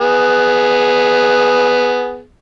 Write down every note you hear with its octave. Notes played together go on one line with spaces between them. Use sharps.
B3 G#4